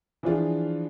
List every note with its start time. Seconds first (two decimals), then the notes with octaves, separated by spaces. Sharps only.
0.23 E3 F3 D4 F4 G#4